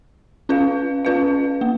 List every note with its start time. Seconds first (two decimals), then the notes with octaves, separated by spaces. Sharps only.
0.49 C#4 F4 B4 F5
1.05 C#4 F4 B4 F5
1.61 A#3